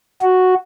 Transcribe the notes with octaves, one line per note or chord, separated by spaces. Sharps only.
F#4